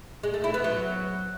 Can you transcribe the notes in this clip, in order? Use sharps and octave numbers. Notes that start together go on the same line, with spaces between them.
G#3
A3
E4
B3
F#3